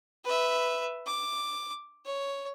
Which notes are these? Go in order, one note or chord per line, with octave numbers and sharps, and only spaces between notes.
B4 E5
D6
C#5